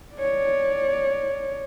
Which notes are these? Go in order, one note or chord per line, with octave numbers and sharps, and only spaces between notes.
C#5 D5